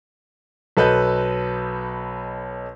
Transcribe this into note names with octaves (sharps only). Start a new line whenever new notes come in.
B1 A4 B4 D#5 G6